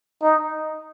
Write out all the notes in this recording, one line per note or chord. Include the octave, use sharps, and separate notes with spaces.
D#4